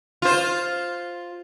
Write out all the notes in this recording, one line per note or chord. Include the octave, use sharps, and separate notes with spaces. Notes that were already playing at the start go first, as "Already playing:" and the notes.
F4 C5